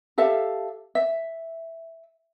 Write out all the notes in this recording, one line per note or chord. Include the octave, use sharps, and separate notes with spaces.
G4 A4 E5 F5
E5